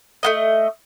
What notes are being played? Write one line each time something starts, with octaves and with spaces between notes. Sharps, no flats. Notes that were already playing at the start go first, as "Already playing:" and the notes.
A3 A#3 D#5